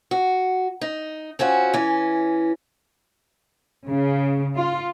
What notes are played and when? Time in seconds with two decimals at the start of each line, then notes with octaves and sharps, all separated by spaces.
0.11 F#4
0.81 D#4
1.39 C4 C#4 F4 F#4
1.74 E3 C#4
3.87 C#3
4.56 F4